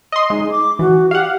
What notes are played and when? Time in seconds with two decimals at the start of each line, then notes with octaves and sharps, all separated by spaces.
0.12 D#5 C6
0.30 G#3 D#4
0.51 D6
0.79 E3 F#4
1.11 G4 F5 F#5